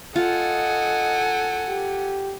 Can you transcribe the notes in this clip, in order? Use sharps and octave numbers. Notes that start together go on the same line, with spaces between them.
F4 A4 D#5 F#5 G#5
G4